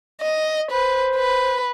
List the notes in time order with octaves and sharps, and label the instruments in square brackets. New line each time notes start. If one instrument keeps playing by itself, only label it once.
[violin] D#5
[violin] B4 [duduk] C5
[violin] B4